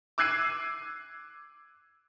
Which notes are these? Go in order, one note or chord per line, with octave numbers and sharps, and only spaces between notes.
D6 E6 F#6 G#6 C7 D#7